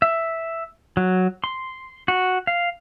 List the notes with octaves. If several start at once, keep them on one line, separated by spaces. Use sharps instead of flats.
E5
F#3
C6
F#4
F5